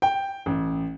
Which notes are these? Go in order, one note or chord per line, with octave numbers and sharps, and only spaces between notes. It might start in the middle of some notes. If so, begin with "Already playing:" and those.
G5
A1